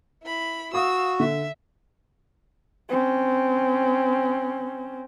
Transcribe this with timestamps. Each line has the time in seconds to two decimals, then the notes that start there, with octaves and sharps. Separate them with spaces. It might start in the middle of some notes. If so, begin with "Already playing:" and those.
0.23 E4 B5
0.74 F#4 F5 D#6 E6
1.20 D3 E5
2.89 C4 C#4